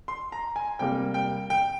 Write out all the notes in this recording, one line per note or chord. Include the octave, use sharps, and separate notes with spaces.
C6
A#5
G#5
C3 G3 A#3 G5
G5
G5